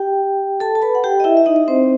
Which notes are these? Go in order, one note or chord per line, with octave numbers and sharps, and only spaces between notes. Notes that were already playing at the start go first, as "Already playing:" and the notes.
Already playing: G4 G5
A4 A5
A5
B4 B5
F#5
G4 G5
D#5
E4 E5
E5
D#4 D#5
D#5
C4 C5